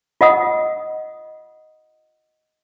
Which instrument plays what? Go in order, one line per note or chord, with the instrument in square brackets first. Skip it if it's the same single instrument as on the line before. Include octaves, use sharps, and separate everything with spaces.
[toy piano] F4 D#5 F#5 D#6